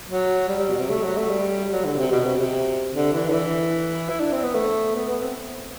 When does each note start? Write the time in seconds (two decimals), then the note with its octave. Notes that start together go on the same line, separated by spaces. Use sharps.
0.08 F#3
0.49 G3
0.59 G3
0.69 B2
0.79 C3
0.90 A3
1.03 F#3
1.16 A3
1.30 G3
1.71 F#3
1.85 D3
1.98 C3
2.12 B2
2.25 C3
2.38 C3
2.93 D3
3.12 E3
3.28 D3
3.33 E3
4.09 E4
4.20 D4
4.32 C4
4.43 B3
4.55 A3
4.95 B3
5.09 B3
5.23 C4